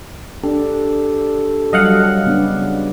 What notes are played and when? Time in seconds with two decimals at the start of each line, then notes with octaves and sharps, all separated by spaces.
0.44 D4 G4 A4
1.73 F#3 G3 D#5 F5 F#5
2.26 C#3 B3 D4